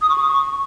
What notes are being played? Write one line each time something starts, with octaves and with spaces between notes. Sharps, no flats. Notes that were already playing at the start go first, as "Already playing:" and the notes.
D#6
C#6
D#6
C#6